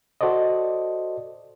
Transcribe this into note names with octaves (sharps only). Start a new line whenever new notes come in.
F#4 A4 C5 D5 D#5